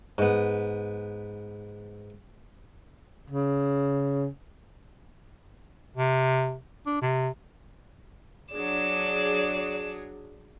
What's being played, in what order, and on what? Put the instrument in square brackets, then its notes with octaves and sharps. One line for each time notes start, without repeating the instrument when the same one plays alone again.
[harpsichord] G#2 B3
[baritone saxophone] C#3
[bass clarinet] C3
D4
C3
[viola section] F#3 D4 G#4 [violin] D5 E7